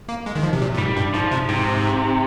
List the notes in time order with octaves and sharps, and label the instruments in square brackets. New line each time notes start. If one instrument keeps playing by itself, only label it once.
[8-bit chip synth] A#3
G#3
D#3
F3
C3
A#2
A#2
[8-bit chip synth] G#2 [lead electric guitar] G3
[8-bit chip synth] G2
[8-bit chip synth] G#2 [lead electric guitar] F3
[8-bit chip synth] C3
[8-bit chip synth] G#2 [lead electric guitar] C3